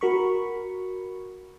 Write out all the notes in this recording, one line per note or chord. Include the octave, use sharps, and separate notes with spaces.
F#4 A#4 B5 C#6